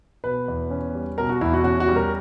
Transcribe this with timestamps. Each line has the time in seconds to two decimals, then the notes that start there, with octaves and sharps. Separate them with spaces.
0.24 B2 B4
0.48 E2
0.70 C#4
0.95 G3
1.18 B2 A#4
1.29 F#4
1.41 E2 E4
1.54 F#4
1.64 C#4 F#4
1.80 F#4
1.88 G3
1.96 A#4